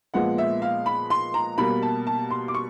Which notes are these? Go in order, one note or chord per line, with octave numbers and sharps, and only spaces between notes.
A#2 F3 G#3 B3 F#5
E5
F5
B5
C6
A#5
B2 G3 A#3 B5
A5
A5
C6
D6
C#6